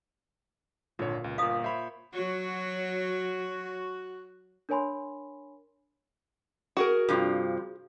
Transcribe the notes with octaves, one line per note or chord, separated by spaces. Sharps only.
G#1 A#2 D3 C#5
C#2
G1 A#2 A#4 F5 D#6
C5 C#5 E5 G5 B5
F#3 F#4 C#5
D4 A#4 C#5 G#5 B5 C6
F#4 G#4 A#4
G2 C3 F3